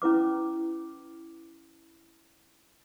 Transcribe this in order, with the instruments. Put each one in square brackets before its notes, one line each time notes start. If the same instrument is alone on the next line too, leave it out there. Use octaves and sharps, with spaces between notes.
[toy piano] C#4 E4 B4 D6